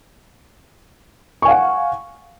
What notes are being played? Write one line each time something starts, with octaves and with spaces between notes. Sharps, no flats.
F5 F#5 G#5 C#6